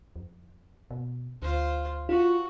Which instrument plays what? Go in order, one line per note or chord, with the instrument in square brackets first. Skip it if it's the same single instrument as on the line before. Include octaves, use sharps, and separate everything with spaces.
[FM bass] F2
B2
[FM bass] D2 [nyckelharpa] F4 C5
[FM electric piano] F4 [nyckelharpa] F#4